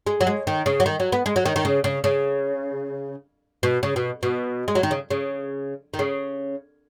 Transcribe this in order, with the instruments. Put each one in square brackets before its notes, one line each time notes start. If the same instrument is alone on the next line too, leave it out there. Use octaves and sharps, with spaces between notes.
[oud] G#3
F#3
G#3
D#3
C#3
F#3
D#3
F#3
B3
G#3
F#3
D#3
D#3
C#3
C#3
C#3
B2
C#3
B2
B2
G#3
F#3
D#3
C#3
C#3
D#3
C#3